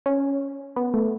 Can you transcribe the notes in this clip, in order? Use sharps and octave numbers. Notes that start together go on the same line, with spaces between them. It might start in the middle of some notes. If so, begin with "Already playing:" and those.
C#4
B3
A3